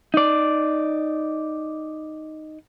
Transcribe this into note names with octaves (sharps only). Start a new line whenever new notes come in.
D#4 D5